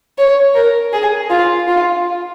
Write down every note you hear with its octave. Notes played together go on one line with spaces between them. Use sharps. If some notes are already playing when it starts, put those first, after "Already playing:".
C#5
A#4
G#4
F4
F4